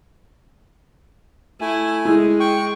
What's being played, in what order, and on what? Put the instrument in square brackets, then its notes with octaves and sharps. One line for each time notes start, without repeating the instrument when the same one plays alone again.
[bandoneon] A3 G#5 [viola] E4
[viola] G#3 [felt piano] E4
[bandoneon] G5 C#6